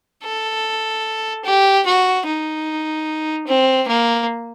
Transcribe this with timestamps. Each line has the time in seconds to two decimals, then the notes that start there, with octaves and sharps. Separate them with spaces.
0.24 A4
1.44 G4
1.86 F#4
2.26 D#4
3.47 C4
3.88 A#3